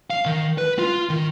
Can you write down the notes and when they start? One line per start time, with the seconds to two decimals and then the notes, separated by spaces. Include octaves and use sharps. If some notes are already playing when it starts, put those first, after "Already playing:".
0.10 F5
0.25 D#3
0.58 B4
0.79 F4
1.09 D#3